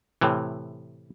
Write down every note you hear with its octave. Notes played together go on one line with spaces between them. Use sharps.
A2 C3 E3